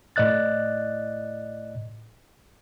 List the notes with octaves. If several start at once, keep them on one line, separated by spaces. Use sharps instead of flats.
A2 D5 D#5 F#6 A6